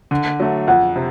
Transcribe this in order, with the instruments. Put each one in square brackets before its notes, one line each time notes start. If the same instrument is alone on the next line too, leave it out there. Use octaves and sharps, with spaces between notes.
[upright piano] D3
F#3 A3
[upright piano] F2 [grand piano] F#5
[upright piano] C3